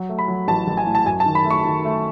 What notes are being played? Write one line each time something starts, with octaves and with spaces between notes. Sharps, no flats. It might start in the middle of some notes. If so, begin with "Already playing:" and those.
Already playing: F#3
A3
B5
F#3
A1 A5
A1
G#5
A2
A5
F#2 G#5
A5
D#3
B5
A3
C#6
D#3
A3